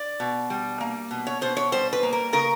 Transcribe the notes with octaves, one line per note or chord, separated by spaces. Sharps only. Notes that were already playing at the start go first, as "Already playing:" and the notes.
Already playing: D5
B2
G3
A#3
B2
C#5
B2 C5
C#5
G3 C5
B4
A#3
A#4
C#3 A#4